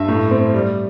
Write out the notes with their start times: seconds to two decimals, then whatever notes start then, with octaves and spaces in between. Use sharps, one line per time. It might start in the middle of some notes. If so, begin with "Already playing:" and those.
Already playing: G2 E5
0.08 A2
0.31 C4
0.54 G3